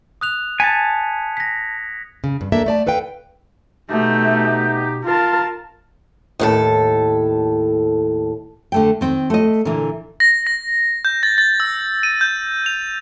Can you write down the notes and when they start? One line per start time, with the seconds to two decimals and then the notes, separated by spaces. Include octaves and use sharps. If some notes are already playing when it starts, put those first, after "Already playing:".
0.21 D#6 F#6 F7
0.60 G#5 A5 G#6 B6 C#7
1.37 A#6 B6
2.24 C#3
2.41 G2
2.52 A#3 D4 A4 E5
2.66 A3 D5 A5
2.87 A4 B4 F5 G5
3.90 B2 A3 D#4 G4
5.05 F4 A#4 A5
6.39 D#2 A2 A4
8.72 D3 A3 G5
9.01 D#3 C4
9.30 A3 D#5
9.65 A#2 D3 E3
10.20 A#6
10.47 A#6
11.05 G6
11.23 A6
11.38 A6
11.60 E6
12.03 D#7
12.21 G6
12.66 F7